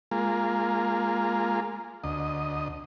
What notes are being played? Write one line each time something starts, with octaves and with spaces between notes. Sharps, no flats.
G#3 A#3 F4
D2 D#5